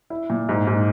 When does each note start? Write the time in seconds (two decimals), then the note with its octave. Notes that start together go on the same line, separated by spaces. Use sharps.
0.10 E4
0.30 A#2
0.49 G#2
0.67 G#2